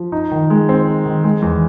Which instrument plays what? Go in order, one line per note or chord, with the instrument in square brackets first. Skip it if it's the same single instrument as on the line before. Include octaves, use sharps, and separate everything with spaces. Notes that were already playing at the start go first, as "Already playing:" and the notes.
Already playing: [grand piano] F3
D#4
D#3
G#3
C4
D#4
D#3
G#3
E2